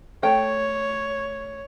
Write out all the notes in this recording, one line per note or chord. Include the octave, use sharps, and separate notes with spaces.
A3 C#5 G5